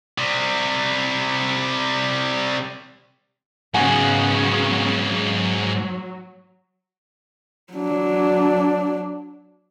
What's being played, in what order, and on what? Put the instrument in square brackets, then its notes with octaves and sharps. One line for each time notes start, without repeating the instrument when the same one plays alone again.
[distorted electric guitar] C3 G3
[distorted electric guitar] G#2 F#4 [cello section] C#3 F#3 B3 [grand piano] F#5 G#5
[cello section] F#3
[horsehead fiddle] F#3 D4